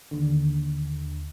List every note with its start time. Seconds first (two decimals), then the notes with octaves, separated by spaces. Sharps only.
0.11 D#2 D3